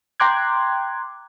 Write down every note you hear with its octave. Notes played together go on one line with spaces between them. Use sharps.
G5 A#5 C6 D6 F#6 G#6